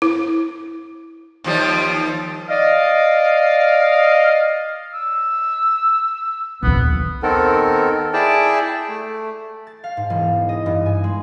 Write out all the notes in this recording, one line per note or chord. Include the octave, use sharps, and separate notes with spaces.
E4
D#2 F3 G3
D5 D#5 F5
E6
A#1 D#2 B3
D#3 B3 C4 A4 A#4
E4 G#4 D5 G5 A5
A3
A6
F5
G#2
E1
D#5
G2
G#5
G#3